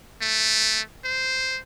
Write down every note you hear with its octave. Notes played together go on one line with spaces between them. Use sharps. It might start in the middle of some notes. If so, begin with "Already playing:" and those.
A3
C5